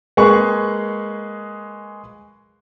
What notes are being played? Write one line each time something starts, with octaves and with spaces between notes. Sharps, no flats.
G#3 A#3 G#4 B4 C#6